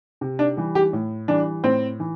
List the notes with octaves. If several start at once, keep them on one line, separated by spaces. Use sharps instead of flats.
C3
D4
E3 G3
G4
A2
E3 G3 D4
A2 C4
E3